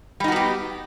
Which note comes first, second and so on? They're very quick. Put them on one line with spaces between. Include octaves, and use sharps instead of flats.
G3 D#4 F#4 B3 G4